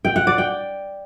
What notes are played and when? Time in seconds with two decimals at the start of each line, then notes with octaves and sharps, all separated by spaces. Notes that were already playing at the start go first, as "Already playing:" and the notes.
0.05 G5
0.16 F#5
0.27 D5
0.38 G5